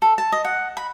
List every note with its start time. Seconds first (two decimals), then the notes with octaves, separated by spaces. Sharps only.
0.02 A4
0.18 A5
0.32 D#5
0.45 F#5
0.77 B5